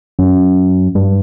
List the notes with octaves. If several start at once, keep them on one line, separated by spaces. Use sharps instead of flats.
F#2
G2